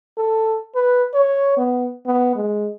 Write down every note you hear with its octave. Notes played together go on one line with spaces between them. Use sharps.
A4
B4
C#5
B3
B3
G#3